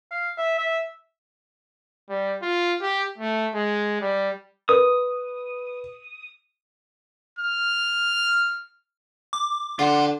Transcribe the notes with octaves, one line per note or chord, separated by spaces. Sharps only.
F5
E5
E5
G3
F4
G4
A3
G#3
G3
B4 D#6
F6
D6
D3 F4 C5 F#5